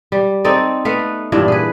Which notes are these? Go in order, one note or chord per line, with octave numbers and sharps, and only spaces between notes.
G3
C4 D#4 A4 D5
A3 B3 B4 F5
G2 A#2 E3 D4
G#4 B4